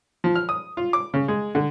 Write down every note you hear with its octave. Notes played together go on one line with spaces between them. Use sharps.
F3
F6
D#6
F4
D6
C#3
G#3
D3